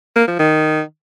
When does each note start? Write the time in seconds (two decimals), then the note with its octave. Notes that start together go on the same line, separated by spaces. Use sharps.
0.16 A#3
0.27 F3
0.39 D#3